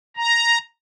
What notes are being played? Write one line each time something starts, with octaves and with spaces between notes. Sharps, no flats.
A#5